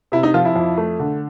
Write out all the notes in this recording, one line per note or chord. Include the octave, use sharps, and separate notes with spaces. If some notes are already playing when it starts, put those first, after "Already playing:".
C3 E4
D#4
F3 F4
E4
F2
A3
D3